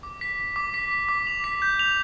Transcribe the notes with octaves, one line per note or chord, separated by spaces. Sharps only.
D6
B6
B6
D6
B6
B6
D6
F7
B6
G6
F7